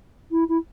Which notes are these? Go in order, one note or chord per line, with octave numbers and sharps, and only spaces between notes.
E4
E4